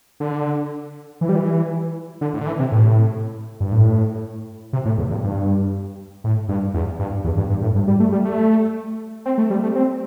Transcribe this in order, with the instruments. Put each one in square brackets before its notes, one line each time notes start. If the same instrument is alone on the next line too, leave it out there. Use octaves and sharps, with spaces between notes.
[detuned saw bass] D3
E3
G3
E3
D3
A2
D3
E3
C3
A2
G2
A2
C3
A2
E2
G2
G2
A2
G2
E2
G2
E2
G2
G2
A2
G2
G3
A3
G3
A3
C4
A3
G3
A3
C4